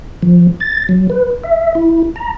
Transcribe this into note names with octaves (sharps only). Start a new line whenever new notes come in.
F3
A6
F#3
B4
E5
E4
A#5